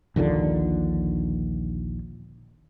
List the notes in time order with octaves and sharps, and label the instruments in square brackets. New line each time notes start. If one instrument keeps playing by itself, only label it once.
[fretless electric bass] A#1 D#2 A#2 D3